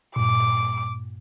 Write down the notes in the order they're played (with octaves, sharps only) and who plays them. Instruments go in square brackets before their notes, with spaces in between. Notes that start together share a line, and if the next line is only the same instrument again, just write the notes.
[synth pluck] G2 A#2 [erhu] D6